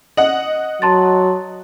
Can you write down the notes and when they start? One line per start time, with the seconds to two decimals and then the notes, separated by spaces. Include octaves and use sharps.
0.17 D#5 F#5 F#7
0.82 F#3 A5 C6 A6